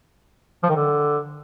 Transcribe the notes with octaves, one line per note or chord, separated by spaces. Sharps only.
F3
D#3
D3